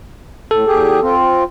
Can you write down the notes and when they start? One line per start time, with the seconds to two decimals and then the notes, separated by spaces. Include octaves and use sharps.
0.51 A2 A4
0.67 E2 G4 G#4
1.02 C4 F4